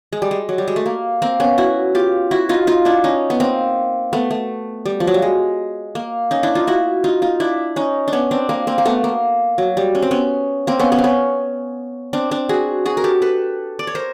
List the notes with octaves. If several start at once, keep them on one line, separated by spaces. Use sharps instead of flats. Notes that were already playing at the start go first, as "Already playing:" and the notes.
G#3
G3
G#3
F#3
G3
G#3
A3
A#3
A#3 C4
B3 C#4
E4 F#4
F4 G4
E4 F#4
D#4 F4
D#4 F4
D4 E4
C#4 D#4
B3
A#3 C4
A3 B3
A3
G3
F3
F#3
G3
G#3
A#3
C#4 D#4
D4 E4
D#4 F4
E4 F#4
D#4 F4
D#4 F4
D4 E4
C#4 D#4
D4
B3 C#4
C4 D4
A#3 C4
A#3 C4
A#3
A3 B3
A#3
F#3
G3
C#4
C4
B3 C#4
A#3 C4
B3 C#4
B3 C#4
C4
B3 C#4
C4 D4
C4 D4
F#4 G#4
F#4 G#4
A#4
G4 A4
A4 B4
D5
C#5
A#4 C5